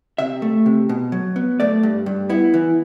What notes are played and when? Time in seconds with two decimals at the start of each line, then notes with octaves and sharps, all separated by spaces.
0.18 C3 E5
0.42 A3
0.66 C3
0.89 B2
1.12 F#3
1.36 B3
1.60 A3 D5
1.83 G2
2.06 G2
2.30 B3 E4
2.54 E3